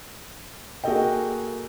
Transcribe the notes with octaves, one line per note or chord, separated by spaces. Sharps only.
A#3 F#4 G#4 A4 D#5 G5